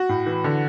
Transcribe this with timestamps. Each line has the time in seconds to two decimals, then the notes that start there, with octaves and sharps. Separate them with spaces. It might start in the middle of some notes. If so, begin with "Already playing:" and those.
Already playing: F#4
0.09 A2
0.26 E3
0.44 D3